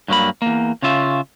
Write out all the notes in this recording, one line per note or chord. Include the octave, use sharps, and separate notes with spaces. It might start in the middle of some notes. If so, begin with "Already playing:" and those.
G2 F#3 A#3 B5
E2 A#3
C#3 C#4 F4 E5